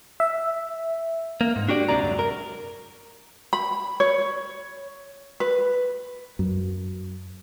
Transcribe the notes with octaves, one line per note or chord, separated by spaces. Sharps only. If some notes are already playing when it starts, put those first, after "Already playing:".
E5
A#3
G#2
D4 F#4 G4 D5
C#2 C3 G#3 D5 A#5
F#2 F#3
A#4
B5
C#5
B4
F#2